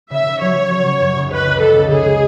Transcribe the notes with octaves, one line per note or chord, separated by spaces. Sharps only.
C#3 E5
C#3
F#3 C#5
F#3
F#3
C#3
F#2
C#3
C#2 B4
C#2
C#2 A4
C#3
C#3 G#4
G#3